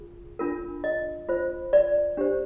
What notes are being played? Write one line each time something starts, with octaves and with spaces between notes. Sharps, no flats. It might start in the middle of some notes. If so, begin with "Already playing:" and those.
Already playing: F4 G#4
D4 F4 A#4
D#5
F4 C5
D5
D4 G4 C5